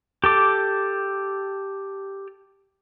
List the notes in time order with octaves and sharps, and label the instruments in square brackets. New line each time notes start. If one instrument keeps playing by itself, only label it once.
[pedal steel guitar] G4 A4 D6